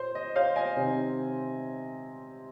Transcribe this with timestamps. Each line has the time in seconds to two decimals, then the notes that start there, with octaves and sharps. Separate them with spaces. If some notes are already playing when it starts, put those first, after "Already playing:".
Already playing: A#2 C5
0.15 D#5
0.36 C5 F5
0.56 D#5 G#5
0.76 C3 D#3 C4